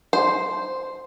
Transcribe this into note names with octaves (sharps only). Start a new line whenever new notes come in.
C5